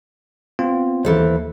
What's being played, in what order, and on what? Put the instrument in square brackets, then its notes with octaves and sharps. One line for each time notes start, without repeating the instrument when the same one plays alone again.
[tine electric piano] B3 C4 F4
[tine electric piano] D#2 [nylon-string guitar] E3 A4 C5